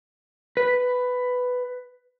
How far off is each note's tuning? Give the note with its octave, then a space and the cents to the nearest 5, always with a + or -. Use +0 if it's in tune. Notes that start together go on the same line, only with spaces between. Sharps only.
B4 +10